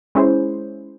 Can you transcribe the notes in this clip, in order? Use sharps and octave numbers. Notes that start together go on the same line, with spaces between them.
G#3 C#4 E4 G#4 C5